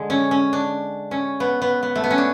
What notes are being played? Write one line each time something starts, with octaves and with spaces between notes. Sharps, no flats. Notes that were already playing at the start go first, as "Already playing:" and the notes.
Already playing: D3 G#3
C#4
C#4
D4
C#4
B3
B3
B3
A3
B3
C#4
D4